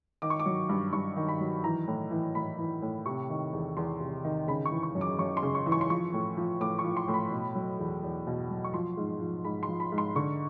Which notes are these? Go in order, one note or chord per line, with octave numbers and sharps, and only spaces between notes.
D#3 D6
C#6
D6
F#3
G2
G2 C#6
D#3
B5
F#3
E3 A#5
A2
E3
A2 B5
E3
A2
C3 C#6
D#3
E2
E2 C6
C3
D#3
C#3 B5
C#6
E3
C#6
F#2
D6
F#2 C#6
C6
C#3
C#6
E3
C#6
C6
F3 C#6
A2
F3
A2 D6
C#6
F3
C6
A2
B5
B2
F#3
E2
E2
B2
F#3
C#6
F3 C6
G#2
F3
G#2 B5
C6
F3
B5
G#2
C6
D3 C#6